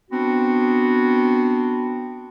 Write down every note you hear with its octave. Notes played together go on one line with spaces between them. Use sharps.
B3 C4 D4 F#4